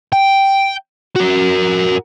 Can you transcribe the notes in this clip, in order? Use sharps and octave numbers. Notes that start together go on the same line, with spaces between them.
G5
F#4 A#4